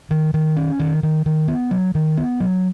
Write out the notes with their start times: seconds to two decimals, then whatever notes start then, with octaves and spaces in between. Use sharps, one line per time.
0.11 D#3
0.34 D#3
0.56 C#4
0.79 D#3
1.03 D#3
1.26 D#3
1.48 B3
1.71 F#3
1.95 D#3
2.17 B3
2.40 F#3